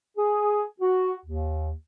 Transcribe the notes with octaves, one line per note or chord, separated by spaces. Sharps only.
G#4
F#4
D#2